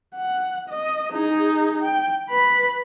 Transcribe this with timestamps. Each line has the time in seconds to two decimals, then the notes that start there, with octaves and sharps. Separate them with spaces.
0.15 F#5
0.69 D#5
1.12 D#4 G#4
1.83 G5
2.30 B4 B5